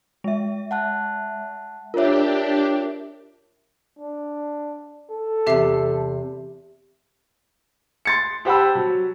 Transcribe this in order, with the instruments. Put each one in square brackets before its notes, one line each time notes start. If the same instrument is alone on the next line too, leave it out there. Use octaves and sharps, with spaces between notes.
[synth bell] G#3 E5
[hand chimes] F#5 A5 F#6
[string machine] D4 G4 [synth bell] F4 C#5 [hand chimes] A#4 E5
[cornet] D4
A4
[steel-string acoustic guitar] E2 C3 [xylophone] G4 E5 C7
[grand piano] C6 A6 C#7
G4 C5 F#5 A5 B5 E6
F#3